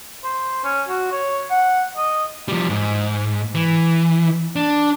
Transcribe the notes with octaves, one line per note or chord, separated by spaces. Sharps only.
C5
C#4
F#4
C#5
F#5
D#5
F3 G3
G#2
E3
D4